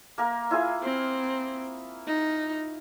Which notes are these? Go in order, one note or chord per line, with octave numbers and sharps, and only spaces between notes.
A#3 A#4
E4 F4 G#4
C4
D#4